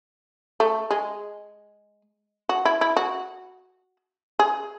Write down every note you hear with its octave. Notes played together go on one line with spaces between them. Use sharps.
A3
G#3
F#4
E4
E4
F#4
G#4